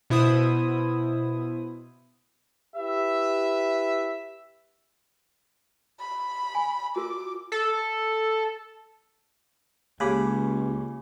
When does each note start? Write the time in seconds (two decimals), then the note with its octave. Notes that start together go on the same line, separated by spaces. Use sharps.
0.10 B2 E4 C5 D#6
2.76 E4 G4 B4 E5
5.99 B5
6.55 G#5
6.96 F4 F#4 A#4 D6
7.52 A4
10.00 C#2 C#3 A#3 G4 G#4 G#5 B5 D6